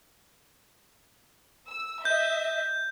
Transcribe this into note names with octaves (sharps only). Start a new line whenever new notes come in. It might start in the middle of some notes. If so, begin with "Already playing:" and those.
E6
D#5 E5 G6